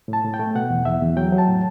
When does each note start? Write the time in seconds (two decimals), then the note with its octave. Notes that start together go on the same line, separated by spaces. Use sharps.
0.08 A2
0.13 A5
0.24 A2
0.34 G5
0.39 A3
0.55 B2 F#5
0.70 E2
0.85 E2 E5
1.02 E2
1.17 F#3 G5
1.32 F#3
1.38 A5
1.48 A2